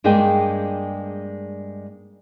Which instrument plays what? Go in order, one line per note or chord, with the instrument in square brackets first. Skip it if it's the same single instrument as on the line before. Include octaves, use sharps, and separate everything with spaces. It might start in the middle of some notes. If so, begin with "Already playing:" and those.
[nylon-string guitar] G2 G#3 A#3 D4 G#4 G5